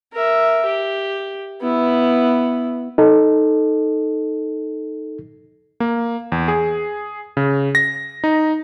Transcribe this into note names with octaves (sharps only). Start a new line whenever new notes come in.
A#4 E5
G4
B3 E4
D#4 A4
A#3
E2
G#4
C#3
A#6
D#4